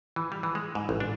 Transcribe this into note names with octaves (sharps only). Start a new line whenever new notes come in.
E3
G3
E3
G#3
G#2
A1
D4